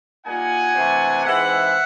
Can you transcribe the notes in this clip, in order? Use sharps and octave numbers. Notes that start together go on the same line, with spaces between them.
A#2 G3 A#3 D#4 F#5 G#5
C3 E3 A3 D4
G#2 E3 G#3 C4 E5 F#5